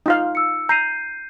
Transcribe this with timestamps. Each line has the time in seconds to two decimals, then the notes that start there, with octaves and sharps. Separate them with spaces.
0.06 D#4 F4 F5
0.35 E6 C#7
0.69 A#5 G6 C7 D#7